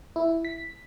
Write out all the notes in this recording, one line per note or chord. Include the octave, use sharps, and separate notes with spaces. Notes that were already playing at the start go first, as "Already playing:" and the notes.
E4
B6